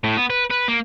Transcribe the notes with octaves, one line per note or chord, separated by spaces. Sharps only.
A2
B3
B4
B4
A#3